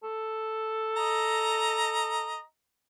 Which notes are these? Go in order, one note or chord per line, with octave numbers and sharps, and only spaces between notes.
A4
D#5 A#5